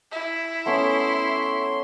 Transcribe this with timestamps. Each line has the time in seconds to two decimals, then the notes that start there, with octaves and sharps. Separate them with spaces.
0.12 E4
0.66 A3 B3 C#4 C6